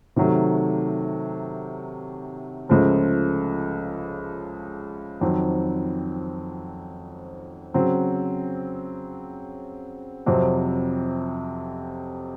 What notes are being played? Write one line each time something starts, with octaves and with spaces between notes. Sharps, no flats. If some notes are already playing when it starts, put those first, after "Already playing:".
C3 D#3 F#3 A3
C#2 C#3 F3 A3
F2 D#3 F#3 C4
C#3 F#3 C4
F2 C3 F#3 C4